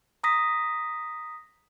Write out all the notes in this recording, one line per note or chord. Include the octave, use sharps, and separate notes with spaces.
A#5 D#6 A#6 B6